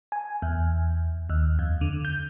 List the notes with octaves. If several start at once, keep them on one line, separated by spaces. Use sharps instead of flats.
G#5
E2
D#2
F2
D3
G6